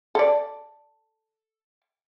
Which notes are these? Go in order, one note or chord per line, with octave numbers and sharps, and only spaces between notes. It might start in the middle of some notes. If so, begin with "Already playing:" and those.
A4 D5